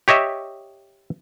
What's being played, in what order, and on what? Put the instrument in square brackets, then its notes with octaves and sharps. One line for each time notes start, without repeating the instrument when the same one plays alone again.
[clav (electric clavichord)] G4 C#5 D#5 E5